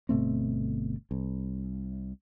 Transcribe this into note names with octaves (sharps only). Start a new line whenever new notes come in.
G1 B2 A3 C4
C2